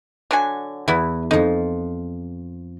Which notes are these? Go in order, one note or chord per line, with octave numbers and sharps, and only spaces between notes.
D3 F#3 G#5
E2 B3 E4
F2 F3 D#4